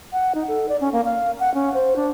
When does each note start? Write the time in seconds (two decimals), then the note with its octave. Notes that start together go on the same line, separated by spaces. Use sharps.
0.13 F#5
0.35 D#4
0.48 A4
0.69 D5
0.81 C#4
0.93 A#3
1.05 F5
1.40 F#5
1.54 C#4
1.74 C5
1.96 D4